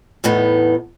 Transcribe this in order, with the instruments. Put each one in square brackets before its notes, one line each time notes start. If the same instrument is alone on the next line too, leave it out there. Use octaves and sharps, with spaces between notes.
[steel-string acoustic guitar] E2 A2 B3 D#4